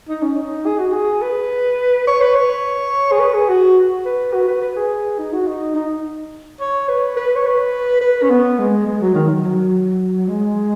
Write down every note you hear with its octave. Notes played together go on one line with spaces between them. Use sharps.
D#4
C#4
D#4
G#4
F#4
G#4
B4
C#5
B4
C#5
G#4
B4
G#4
F#4
B4
F#4
B4
B4
G#4
D#4
F#4
D#4
D#4
C#5
B4
B4
C#5
B4
B4
C#4
B3
G#3
G#3
F#3
D#3
F#3
F#3
G#3